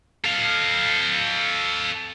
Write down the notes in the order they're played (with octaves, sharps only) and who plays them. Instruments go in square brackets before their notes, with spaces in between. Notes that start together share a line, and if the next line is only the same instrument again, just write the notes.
[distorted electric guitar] A4 F5